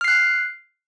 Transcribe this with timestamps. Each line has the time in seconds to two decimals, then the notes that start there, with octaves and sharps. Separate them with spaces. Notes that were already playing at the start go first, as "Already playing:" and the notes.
0.01 F6
0.04 C7
0.08 F#6